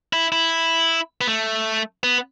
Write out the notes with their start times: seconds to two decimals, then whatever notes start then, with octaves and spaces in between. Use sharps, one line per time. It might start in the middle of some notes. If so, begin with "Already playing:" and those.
0.13 E4
0.32 E4
1.21 B3
1.28 A3
2.03 B3